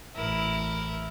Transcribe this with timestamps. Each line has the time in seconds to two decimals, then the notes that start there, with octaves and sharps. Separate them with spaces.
0.15 A1 E4 A#4